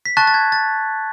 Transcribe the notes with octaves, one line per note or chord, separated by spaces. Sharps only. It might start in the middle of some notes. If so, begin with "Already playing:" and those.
B6
A5 C#6 F#6 A6
A6
G#6
A6